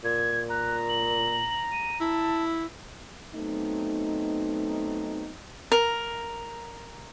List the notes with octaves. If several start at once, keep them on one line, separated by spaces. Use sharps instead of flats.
A#2 G#6
A#5 F#6
F#7
D#7
E4 A5
F#3 A3 B3 C4 D#4
A#4